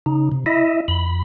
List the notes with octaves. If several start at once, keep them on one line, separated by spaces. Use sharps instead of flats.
C#3 D#4
C3
E4 D#5 E5
F2 B5